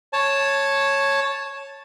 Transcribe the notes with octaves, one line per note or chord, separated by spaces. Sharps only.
C#5 A5